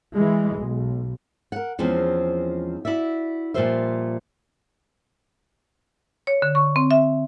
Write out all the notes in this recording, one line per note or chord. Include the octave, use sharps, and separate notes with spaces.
E3 G#3
B1
A#4 F#5
E2 F3 G#3 C4 C#4
E4 F#4 D5 E5
A#2 F3 G3 F4 C5 E5
C#5
D3
C#6
C4
E5